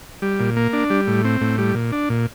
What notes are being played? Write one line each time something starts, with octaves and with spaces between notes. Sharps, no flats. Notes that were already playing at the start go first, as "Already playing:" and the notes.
G3
A#2
A#3
D4
G3
A2
C4
A2
G3
A#2
D4
A#2